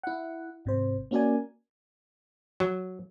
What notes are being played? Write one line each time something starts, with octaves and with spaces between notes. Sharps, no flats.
E4 F#5
G#1 C3 C5
A#3 C#4 F#4 A#4 D5 G#5
F#3